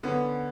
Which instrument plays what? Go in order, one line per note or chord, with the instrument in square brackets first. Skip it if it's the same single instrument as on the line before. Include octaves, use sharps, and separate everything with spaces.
[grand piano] D3 [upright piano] B3 C#4